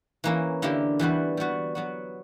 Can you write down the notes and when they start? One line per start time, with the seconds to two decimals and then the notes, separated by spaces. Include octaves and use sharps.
0.24 E3 A#3 C#4 E4
0.62 D3 A#3 E4 G4
0.99 E3 G3 B3 F#4
1.37 G3 B3 F#4
1.75 F#3 B3 F#4